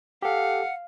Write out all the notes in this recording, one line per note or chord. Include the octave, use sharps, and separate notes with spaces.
G4 A4 F5 F#5